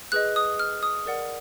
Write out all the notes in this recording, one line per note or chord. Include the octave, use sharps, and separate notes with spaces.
G#4 B4 D#5 F#6
D#6
F6
D#6
A#4 D5 F#5